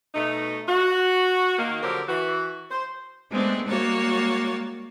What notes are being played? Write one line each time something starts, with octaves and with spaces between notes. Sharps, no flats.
B2 A3 D#4
F#4
D#3 A#3
D3 F3 F#3 G4 A4 A#4
E3 F#4
C5
G#3 A3 B3 C4 D4
G3 G#3 A#3 F#4 C#5 A6